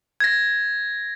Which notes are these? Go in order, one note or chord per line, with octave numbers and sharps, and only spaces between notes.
G#6 A#6